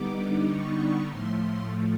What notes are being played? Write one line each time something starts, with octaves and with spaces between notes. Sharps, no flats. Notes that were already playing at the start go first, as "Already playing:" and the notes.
Already playing: D3 G3 B3 D#4 D6
C#6
A2 F3 A3 C6